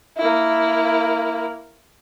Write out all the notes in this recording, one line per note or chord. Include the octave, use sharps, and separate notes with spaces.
A#3 E4